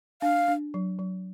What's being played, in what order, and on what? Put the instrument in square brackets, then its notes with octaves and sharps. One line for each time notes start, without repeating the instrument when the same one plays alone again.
[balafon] D4 [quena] F5
[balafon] D4
F#3
F#3